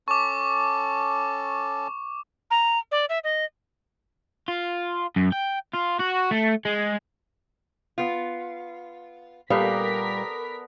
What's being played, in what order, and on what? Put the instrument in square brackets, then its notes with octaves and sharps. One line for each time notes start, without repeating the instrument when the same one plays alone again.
[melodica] C#4 A4 A5 [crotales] C#6 D6
[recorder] A#5
D5
E5
D#5
[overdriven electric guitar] F4
F#2
G5
F4
F#4
A3
G#3
[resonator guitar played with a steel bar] B3 F4
[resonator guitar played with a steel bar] A#2 F5 [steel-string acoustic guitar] G3 [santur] B3 A4 D5 [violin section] A#4 B6